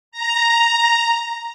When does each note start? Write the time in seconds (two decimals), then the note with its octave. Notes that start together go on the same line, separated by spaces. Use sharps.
0.12 A#5